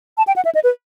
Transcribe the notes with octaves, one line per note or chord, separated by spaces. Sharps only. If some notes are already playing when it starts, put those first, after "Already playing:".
A5
G5
F#5
E5
D#5
B4